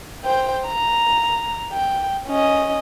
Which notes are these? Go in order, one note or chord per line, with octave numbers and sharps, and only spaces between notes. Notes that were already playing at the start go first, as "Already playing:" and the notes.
C5 G5
A#5
G5
C#4 D#5